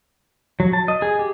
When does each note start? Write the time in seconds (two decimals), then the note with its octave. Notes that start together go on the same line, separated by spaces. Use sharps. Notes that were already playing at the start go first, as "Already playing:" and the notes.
0.60 F#3
0.73 A5
0.88 D#5
1.02 G#4
1.19 G4